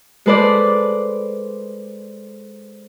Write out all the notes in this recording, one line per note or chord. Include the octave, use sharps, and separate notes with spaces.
G#3 A4 B4 C5 D5